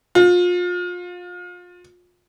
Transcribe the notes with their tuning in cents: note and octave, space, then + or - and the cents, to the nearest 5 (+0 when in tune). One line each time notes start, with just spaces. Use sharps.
F4 +30